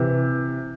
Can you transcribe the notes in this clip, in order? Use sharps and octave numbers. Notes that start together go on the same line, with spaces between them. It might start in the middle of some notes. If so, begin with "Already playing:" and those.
Already playing: C3 E3